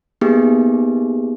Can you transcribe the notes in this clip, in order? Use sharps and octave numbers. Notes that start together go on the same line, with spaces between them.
A#3 B3 D#4 G4 G#4